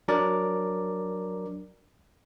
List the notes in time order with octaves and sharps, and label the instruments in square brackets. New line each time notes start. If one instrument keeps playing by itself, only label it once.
[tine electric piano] F#3 D4 A#4 D5